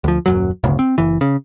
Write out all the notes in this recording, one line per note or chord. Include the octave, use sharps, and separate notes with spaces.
D2 F3
D#1 F#2 F#3
D1 G1 D2 C#3
C4
F#1 E3
C#3